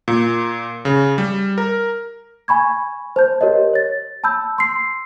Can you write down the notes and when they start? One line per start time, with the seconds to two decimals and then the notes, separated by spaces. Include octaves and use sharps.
0.08 A#2
0.85 C#3
1.18 G3
1.58 A#4
2.48 G#5 B5 C#6 G#6
3.16 C5 A5 G6
3.41 G4 A#4 C#5 D#5
3.74 C#5 A6
4.24 A5 B5 E6 G6
4.58 C6 E6 C7